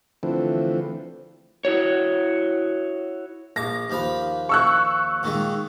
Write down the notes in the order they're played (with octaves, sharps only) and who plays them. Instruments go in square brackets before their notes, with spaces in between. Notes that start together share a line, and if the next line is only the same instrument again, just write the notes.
[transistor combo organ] D3 E3 F3 A3 C4
[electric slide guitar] E4 F#4 C#5
[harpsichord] A#1 D6 [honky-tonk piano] A#6
[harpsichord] D#2 F3 B5
[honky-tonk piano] C#6 E6 F#6
[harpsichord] A#2 D#3 G#3